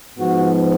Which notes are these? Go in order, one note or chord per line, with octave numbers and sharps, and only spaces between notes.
G#2 F3 B3 F#4